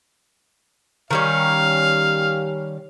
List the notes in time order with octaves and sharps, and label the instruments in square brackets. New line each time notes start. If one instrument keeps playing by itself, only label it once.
[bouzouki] D#3 G3 C#4 [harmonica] F5